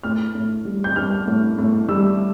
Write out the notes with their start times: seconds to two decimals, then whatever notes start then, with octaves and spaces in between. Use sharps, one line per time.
0.03 A2 F6
0.35 A2
0.65 G3
0.84 G6
0.96 G3 F6
1.27 A2
1.58 A2
1.89 G3 E6